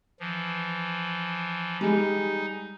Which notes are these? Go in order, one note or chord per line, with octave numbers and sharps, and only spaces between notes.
E3 F3
G3 G#3 D#4